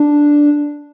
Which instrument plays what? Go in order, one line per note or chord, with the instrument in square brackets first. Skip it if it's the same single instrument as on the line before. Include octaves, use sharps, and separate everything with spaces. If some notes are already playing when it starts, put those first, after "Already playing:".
Already playing: [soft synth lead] D4